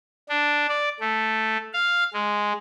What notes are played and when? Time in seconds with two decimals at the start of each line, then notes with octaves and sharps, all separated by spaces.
0.29 D4
0.69 D5
1.00 A3
1.73 F5
2.14 G#3